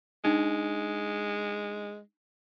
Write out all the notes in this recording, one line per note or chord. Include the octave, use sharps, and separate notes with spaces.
G#3 D4 D#4